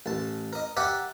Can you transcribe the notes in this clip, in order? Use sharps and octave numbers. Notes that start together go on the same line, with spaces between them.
A1 A5
A#4 D#5
G4 A#4 D5 E5 F#5 G5